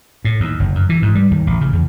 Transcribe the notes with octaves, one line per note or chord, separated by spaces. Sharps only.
A2
D#2
F#1
F#2
E3
G#2
G3
D#2
A1
C#3
E2